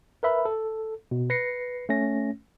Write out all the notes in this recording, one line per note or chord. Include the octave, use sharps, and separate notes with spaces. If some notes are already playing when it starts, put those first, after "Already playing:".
A#4 B4 E5 B5
A4
B2
B4 A#6 C7 C#7
A3 C#4 A#6